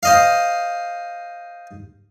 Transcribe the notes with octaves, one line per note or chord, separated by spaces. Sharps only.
C5 D#5 F5